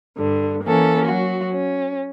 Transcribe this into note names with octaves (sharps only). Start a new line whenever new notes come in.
G2 D3
E3 A#3 C#4 A4
F#3 F#4
C#4